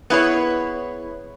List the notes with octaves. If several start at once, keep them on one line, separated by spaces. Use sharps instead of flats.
B3 E4 G#4 C#5